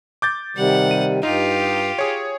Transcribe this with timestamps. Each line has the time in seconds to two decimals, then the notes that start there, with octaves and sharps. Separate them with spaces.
0.22 D6 G6 A6
0.57 C3 D#3 G3 F#5
0.91 D#7
1.23 G2 D#4 F4 G4
1.99 G#4 C#5